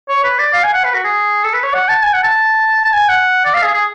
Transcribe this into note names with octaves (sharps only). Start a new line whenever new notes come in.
C#5
B4
D5
F5
G#5
F#5
B4
F#4
G#4
A4
B4
C#5
F#5
A5
G#5
F#5
A5
A5
G#5
F#5
D5
F5
G#4
G#4